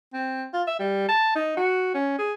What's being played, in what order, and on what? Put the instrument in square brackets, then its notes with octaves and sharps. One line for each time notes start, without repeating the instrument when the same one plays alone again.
[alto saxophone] C4
F4
E5
G3
A5
D#4
F#4
C#4
G#4